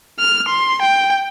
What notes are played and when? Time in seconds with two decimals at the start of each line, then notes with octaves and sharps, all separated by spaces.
0.20 F6
0.49 C6
0.82 G5